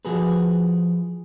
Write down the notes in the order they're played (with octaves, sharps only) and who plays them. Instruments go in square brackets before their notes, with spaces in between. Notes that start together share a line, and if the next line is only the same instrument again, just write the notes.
[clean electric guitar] F3 F#4 G#4 A4 B4